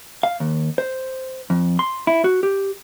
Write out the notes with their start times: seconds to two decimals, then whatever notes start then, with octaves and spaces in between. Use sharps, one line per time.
0.23 F5
0.40 D#2
0.78 C5
1.50 F2
1.79 C6
2.07 E4
2.24 F#4
2.43 G4